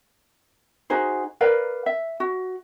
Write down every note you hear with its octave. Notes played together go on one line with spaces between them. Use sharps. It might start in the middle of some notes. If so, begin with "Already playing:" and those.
D#4 F#4 G#4 C5
A#4 B4 D5 F5
E5
F#4